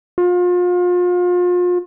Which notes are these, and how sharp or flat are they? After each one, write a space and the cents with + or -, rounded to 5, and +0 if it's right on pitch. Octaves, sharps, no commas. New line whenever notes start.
F4 +35